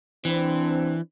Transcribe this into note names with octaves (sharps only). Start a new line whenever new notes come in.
E3 C4 D4